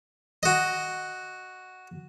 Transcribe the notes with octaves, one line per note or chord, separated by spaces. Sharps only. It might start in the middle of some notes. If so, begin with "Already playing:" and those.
F#4 D#5